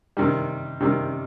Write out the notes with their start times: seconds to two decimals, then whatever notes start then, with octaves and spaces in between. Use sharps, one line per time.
0.17 C3 D#3 G3
0.81 C3 D#3 G3